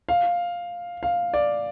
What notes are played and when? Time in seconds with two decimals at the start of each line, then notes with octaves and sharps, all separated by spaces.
0.09 F5
1.03 F5
1.34 D5